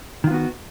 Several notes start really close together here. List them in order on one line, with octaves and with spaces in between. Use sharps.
D#3 F4 B3 F#4